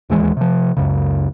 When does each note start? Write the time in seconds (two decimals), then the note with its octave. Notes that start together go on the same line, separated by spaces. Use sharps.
0.10 D1 D#2 E3 G#3
0.37 C3 F3
0.77 C#2 F#2 C#3